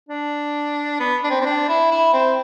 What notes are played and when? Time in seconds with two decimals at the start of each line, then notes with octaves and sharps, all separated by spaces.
0.09 D4
1.00 B3
1.24 D4
1.30 C4
1.41 C4
1.45 D4
1.68 E4
1.91 E4
2.13 C4